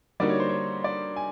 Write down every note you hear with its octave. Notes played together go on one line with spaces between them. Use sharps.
D3 G3 A#3 D#4 F#4 D5
C#5
C5
C#5
D5
G#5